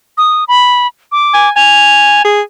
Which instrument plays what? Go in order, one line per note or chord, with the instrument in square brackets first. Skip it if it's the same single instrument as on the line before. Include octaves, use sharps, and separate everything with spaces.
[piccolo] D#6
B5
D6
[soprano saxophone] G#5
[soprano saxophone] G#5 [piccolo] F7
[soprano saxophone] G#4